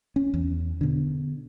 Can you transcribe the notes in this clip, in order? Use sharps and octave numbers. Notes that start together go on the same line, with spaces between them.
C#4
E2
B2 D3